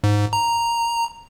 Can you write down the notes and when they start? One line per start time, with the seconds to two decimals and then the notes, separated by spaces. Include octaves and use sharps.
0.04 G#2
0.33 A#5